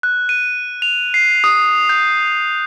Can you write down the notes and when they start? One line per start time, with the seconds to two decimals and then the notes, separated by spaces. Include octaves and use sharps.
0.03 F#6
0.29 D#7
0.82 F7
1.14 C7
1.44 D#6
1.89 G6